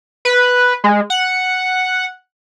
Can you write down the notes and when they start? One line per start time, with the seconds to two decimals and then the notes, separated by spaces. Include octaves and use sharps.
0.25 B4
0.84 G#3
1.10 F#5